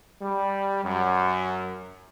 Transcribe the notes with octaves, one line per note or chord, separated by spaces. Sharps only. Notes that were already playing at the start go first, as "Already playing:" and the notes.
G3
F#2